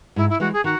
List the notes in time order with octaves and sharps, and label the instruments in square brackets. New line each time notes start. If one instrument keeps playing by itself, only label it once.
[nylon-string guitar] G#2 [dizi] E4
[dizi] E4
[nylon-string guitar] E3 G#3 [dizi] F#4
[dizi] G#4
[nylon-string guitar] D#3 [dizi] F#4